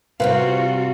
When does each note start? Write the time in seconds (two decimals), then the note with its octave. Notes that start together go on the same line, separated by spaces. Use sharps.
0.20 C3 G3 C4 F4 F#4 B4 F5